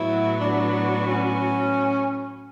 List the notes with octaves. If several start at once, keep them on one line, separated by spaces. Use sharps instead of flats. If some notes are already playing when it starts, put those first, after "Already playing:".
Already playing: A2 F#3 B3 E4 F#4
D4
D4
C#4